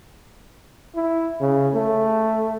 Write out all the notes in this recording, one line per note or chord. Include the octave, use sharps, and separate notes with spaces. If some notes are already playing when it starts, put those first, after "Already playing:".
E4
C#3
A3